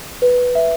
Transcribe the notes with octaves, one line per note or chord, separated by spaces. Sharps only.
B4
E5